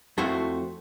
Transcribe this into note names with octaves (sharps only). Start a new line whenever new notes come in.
F2 A3 E4 F#4 C5 C6